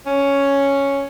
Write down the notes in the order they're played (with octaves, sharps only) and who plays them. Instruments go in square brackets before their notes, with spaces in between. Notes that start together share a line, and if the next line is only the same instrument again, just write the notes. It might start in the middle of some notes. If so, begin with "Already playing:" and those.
[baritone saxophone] C#4